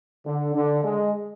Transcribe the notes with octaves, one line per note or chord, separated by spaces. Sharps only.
D3
D3
G#3